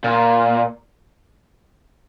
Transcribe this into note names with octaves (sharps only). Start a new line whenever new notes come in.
A#2